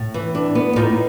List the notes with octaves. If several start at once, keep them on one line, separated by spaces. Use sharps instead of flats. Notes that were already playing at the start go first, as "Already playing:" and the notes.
Already playing: A2
E3
D4
B3
A2 D#4 F4